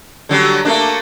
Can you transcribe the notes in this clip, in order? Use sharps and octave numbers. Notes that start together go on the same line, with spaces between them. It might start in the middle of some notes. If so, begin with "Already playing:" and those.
D3 F#3 G3
A3 A#3 D4